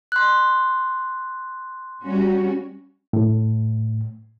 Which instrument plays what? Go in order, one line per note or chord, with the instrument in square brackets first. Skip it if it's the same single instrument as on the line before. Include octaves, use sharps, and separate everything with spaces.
[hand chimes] C6 F#6
[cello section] G3 C#4 F#4
[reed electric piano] A2